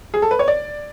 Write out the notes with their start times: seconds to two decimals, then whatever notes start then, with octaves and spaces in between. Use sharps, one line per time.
0.14 G#4
0.22 A4
0.31 B4
0.39 C#5
0.48 D5